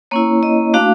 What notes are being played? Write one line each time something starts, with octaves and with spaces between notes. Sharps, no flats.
A#3 C#4 E4 C#5
D#5
A3 D4 F#4 F5